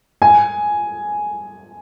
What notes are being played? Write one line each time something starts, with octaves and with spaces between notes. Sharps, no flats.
G#5